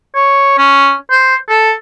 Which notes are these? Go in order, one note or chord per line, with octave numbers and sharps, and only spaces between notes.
C#5
C#4
C5
A4